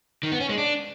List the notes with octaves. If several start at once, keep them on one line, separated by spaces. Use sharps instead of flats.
D#3
B3
C#4
G#3
D4